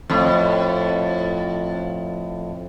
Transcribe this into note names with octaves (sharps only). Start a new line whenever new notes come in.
F2 A2